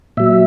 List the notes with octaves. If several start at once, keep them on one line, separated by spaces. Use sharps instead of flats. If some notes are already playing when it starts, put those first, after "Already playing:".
A#2 F#3 E5